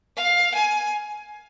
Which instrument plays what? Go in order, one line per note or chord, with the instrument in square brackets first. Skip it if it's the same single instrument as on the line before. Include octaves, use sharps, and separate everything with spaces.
[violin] F5
G#5